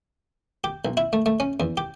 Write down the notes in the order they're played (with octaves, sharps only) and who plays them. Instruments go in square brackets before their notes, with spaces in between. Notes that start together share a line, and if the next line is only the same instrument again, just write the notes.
[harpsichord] G4
B1
E4
A3
A3
C#4
E2
G4